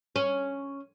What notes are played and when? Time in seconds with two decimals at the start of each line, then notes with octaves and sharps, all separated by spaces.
0.16 C#4